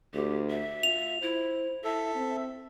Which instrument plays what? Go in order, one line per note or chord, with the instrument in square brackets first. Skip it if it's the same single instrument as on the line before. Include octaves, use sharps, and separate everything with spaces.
[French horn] D2 [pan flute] G4
[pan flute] E5
[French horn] F4 [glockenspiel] F7
[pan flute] E4 [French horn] C5
[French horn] E4 [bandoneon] A4 [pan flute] E5
[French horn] C4